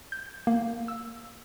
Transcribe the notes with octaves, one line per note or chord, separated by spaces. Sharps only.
G6
A#3
E6